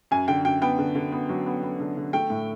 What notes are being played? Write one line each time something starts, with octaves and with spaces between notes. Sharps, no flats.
F#2 G#5
D3 G5
F#2 G5
B3 G5
D3
D3
B3
F#3
B3
B3
D3
D3
A3 G5
A2